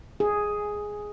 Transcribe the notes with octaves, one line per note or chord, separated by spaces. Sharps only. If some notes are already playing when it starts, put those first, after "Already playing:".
G#4